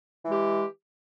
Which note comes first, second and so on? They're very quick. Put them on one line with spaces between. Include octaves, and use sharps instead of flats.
E3 G#3 G4